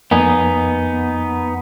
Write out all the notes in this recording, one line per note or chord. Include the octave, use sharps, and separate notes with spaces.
F2 A#3 B3 D#4 G#5